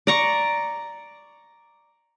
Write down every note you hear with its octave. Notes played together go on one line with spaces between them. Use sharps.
D5 A#5 C#6